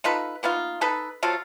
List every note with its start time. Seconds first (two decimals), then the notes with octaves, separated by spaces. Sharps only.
0.04 D#4 F4 A4 B4
0.43 A#3 B3 D#4 F4
0.81 D#4 A4 B4
1.23 F3 F#3 F4 A4